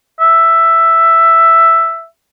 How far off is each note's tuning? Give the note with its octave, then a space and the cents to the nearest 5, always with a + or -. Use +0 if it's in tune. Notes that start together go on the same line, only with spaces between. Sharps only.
E5 +5